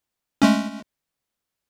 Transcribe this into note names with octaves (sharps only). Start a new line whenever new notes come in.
G#3 A3 C#4